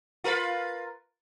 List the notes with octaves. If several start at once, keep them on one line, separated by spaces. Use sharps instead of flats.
F4 A#4 B4